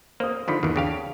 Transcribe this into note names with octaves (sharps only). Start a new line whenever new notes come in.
A#3 C5 D#6
D3 D#3 F3 B5 B6
D#2 D#3 E3
C#3 D4 G4 F5